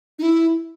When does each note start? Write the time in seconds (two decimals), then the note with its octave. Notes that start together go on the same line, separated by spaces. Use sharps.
0.19 D#4
0.23 E4